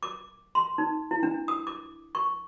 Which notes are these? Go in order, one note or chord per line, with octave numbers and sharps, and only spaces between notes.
D6
C6
D#4
E4
D4
D#6
D6
C#6